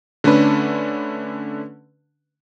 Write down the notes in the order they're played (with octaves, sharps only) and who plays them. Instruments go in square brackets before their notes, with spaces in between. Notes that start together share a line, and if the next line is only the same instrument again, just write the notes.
[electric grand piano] D3 A3 C#4 D4 B4